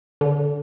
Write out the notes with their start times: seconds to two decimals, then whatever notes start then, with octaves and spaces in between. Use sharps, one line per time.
0.21 D3